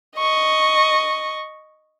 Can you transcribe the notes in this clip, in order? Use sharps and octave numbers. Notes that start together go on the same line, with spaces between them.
D#5 C#6